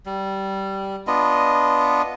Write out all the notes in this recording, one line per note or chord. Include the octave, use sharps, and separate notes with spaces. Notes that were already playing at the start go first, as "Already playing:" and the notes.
G3
B3 D4 F4 D#5